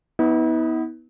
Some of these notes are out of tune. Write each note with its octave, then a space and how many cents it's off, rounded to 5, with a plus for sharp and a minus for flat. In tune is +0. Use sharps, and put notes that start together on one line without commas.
B3 +0 E4 -45